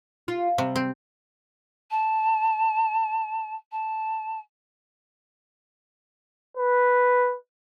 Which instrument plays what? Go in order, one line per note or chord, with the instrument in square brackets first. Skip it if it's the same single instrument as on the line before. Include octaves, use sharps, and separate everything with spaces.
[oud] F4
[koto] C3 [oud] G3
[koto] C4
[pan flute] A5
A5
[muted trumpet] B4